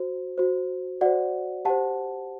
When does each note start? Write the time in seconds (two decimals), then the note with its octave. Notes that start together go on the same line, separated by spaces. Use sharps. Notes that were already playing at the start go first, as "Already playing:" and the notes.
Already playing: F#4 C5
0.38 F#4 C5
1.01 F#4 C5 D5 F#5
1.65 G4 C5 F#5 A5